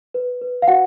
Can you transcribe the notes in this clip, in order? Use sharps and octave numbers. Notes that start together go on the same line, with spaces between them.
B4
B4
F5
F#4 F#5